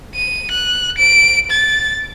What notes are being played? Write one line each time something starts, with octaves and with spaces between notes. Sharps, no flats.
D#7
F#6
D7
A6